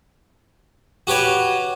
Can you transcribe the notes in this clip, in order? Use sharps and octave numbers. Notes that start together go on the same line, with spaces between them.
F#4 G4 B4 C#5